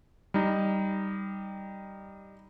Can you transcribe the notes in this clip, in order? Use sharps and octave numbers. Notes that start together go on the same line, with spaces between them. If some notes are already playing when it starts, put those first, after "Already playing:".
G3 D#4